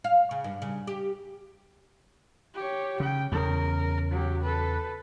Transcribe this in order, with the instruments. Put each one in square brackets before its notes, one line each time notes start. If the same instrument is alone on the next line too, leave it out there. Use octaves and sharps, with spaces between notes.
[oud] F5
C#3
G2
C#3
G4
[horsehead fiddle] G4 C#5
[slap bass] C#3 [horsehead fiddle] G5
[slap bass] E2 C#3 [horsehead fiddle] A#4
[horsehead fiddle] F#3 G4
A4 B4